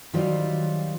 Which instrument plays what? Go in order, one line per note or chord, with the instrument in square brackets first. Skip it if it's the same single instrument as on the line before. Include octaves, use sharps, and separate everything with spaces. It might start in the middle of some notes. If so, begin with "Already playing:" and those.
[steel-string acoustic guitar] D#3 F#3 G3 F4 C5